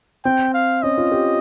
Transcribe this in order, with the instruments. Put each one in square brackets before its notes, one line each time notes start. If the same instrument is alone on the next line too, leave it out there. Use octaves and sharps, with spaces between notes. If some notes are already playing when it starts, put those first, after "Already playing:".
[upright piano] C4 [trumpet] G5
[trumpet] F5
[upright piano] C#4 [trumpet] D#5
[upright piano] F4
G4